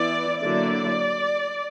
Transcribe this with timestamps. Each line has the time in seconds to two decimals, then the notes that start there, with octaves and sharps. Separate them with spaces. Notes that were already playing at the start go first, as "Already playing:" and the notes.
Already playing: E3 B3 E4 D5
0.41 D3 F#3 A#3 E4 D5